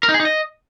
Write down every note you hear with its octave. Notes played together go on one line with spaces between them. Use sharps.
A#4
D#4
G#4
D#4
D#5